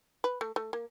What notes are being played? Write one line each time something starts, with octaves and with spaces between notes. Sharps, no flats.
B4
A3
A3
A#3